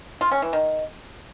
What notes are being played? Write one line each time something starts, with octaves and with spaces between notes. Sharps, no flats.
F4
C#4
E3
D#3